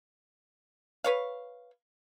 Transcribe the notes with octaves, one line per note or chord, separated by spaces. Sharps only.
B4 C#5 F5